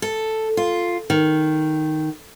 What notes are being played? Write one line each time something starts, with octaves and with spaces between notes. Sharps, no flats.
A4
F4
D#3